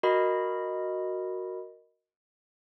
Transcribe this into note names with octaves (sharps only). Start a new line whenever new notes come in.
F#4 A#4 D#5 B5